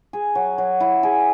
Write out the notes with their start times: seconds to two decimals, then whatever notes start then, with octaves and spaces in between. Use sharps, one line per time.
0.13 G#4
0.35 F#3
0.58 F#3
0.80 E4
1.03 G#4